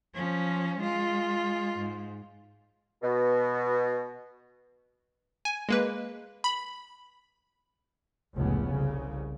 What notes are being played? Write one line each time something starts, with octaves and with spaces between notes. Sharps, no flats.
F3 C#4
G#3 F4
G#2
B2
G#5
G#3 A#3 B4
B5
F1 C#2 A2 B3 C#4
C2 C#3